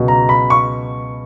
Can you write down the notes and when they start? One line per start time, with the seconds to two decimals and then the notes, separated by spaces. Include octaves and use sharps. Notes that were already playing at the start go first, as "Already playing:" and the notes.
Already playing: C#2 B2 F#3
0.08 A#5
0.29 B5
0.50 C#6